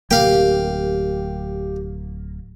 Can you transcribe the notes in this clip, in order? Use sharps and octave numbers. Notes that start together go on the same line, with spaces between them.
D1 A#3 G4 F5 G5